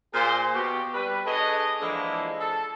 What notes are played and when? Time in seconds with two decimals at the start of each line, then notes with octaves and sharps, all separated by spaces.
0.14 A#2 G#4 C5
0.54 B2 F#4 G4
0.94 G3 B4
1.25 D4 G#4 A4 B4 C#5 D#5
1.80 D3 E3 F3 G#3 A#3 E4
2.40 A4